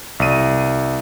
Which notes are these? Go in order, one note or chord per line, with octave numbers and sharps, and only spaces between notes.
C2 D#7